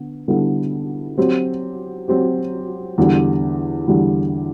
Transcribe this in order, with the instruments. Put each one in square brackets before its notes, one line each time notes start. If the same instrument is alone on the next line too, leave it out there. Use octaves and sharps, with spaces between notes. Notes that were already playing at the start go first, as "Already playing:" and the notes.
Already playing: [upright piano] D3 B3
D3 G3 B3 E4 A4
F#3 C4 G4
F#3 C4 G4
E2 D3 G3
E2 D3 G3